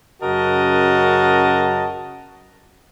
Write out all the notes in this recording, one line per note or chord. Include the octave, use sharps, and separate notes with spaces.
F#2 C#3 F#4 A#4 D#5 A5